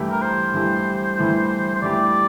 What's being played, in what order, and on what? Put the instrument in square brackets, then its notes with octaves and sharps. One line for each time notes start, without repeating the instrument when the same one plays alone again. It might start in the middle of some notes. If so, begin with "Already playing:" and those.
Already playing: [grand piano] G2 E3 A3 E4 G4
[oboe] A#4
C5
[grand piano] G2 E3 A3 E4 G4
G2 E3 A3 E4 G4
[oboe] C5
[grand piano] G2 E3 A3 E4 G4 [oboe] D5